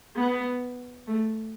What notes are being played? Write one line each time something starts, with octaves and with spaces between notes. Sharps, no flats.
B3
A3